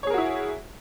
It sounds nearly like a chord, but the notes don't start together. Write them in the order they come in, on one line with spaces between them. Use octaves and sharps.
C#5 G#4 A#4 F#4 E4